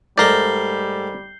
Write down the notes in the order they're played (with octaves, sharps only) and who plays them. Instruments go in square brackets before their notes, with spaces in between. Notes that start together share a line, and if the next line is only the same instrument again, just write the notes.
[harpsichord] G#2 A3 [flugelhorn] G3 [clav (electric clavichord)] A#4 D5 [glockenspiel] G6 C7 G7